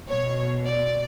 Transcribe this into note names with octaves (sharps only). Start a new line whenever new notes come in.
B2 C#5
D5